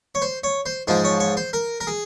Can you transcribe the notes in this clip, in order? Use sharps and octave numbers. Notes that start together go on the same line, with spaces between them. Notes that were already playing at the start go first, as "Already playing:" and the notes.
C#5
C5
C#5
C5
G#2 F3 G#3 C5
C#5
C#5
C5
A#4
A#4
G#4